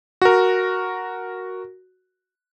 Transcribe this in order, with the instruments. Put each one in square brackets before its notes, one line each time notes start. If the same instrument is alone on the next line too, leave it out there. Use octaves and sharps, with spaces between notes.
[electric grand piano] F#4 A#4